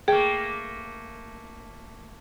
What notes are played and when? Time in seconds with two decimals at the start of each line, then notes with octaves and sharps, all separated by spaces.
0.08 A3 A#3 G#4 G5